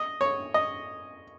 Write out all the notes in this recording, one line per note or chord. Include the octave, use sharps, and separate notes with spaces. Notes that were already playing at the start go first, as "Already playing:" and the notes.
Already playing: D#5
C#5
D#5